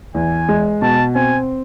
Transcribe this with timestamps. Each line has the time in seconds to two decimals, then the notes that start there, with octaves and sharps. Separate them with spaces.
0.14 E2 G#5
0.48 G#3
0.82 B2 A5
1.15 C4 G#5